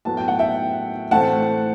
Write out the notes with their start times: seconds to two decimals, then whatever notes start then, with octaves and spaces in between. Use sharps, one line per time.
0.05 A2 F#3 B3 A5
0.17 G5
0.28 F#5
0.39 E5 G5
1.11 A2 E3 A3 C4 F#5 A5